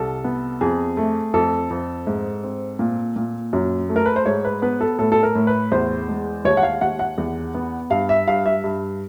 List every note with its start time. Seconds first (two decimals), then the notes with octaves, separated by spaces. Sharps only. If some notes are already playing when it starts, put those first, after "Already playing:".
Already playing: C2 A4
0.24 B3
0.61 F2 G#4
0.97 A3
1.34 F2 A4
1.70 F2
2.07 G#2
2.44 C4
2.79 A#2
3.16 A#2
3.53 F#2
3.89 A3
3.96 A#4
4.06 B4
4.16 C5
4.26 G#2 C#5
4.45 B4
4.62 B3 B4
4.81 A4
4.99 A2 A4
5.12 A4
5.23 A#4
5.35 A2
5.47 B4
5.72 E2 C5
6.08 G#3
6.45 D#2 C#5
6.57 F#5
6.63 F5
6.81 D#2 F#5
6.99 F#5
7.18 E2
7.54 B3
7.90 G2 F5
8.09 E5
8.28 G2 F5
8.46 E5
8.64 G2